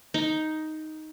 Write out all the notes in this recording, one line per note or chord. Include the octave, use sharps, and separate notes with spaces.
D#4